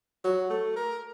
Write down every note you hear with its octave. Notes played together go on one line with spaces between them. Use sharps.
F#3
A3
A#4